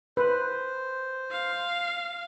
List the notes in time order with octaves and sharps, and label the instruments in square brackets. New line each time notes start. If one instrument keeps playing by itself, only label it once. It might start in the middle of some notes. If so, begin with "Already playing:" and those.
[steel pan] B4 [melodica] C5
[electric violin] F5